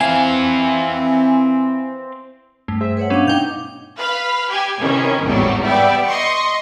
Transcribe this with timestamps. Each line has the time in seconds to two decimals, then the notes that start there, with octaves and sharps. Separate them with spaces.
0.01 E3 C4 F5 G#5
2.68 G2 A3
2.81 G#4 C5 E5
2.97 B4 C#5 F#5
3.10 F#3 B3 C#4 D4 F5 D6
3.25 B2 D#4 G5 G6 F7
3.99 B4 F5 B5
4.49 G4 G#5
4.79 C3 D#3 E3 C#4
5.23 G#1 E2 A2 F#3 G3
5.62 G3 B3 D5 E5 G5
6.07 D#5 C6 C#6